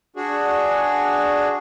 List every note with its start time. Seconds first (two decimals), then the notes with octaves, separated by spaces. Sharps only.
0.16 D4 F#4 G#4